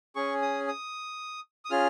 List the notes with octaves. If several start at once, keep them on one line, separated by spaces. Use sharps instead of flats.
C#4 G#4 C#6
D#6
D#6
D#6
C#4 F4 G#4 F6